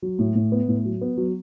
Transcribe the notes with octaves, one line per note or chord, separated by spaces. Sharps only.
F#3
A2
A2
B3
A2
F#3
B3
F#3